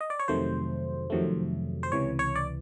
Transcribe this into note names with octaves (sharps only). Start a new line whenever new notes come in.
D#5
D5
C#5
F2 C3 D#3 F#3 A3 C5
F2 C3 D#3 F#3 A3
C5
C#2 C3 E3 C#5
C#5
D5